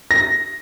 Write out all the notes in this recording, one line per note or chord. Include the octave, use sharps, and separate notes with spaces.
A#6